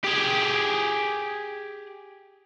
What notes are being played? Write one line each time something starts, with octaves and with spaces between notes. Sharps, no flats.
G4 G#4